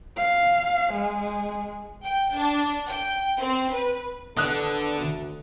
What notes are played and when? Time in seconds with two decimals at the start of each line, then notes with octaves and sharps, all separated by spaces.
0.17 F5
0.93 G#3
2.04 G5
2.35 D4
2.88 G5
3.40 C4
3.73 B4
4.37 D3 B3 D4 A4 D#6 F#6
4.99 D2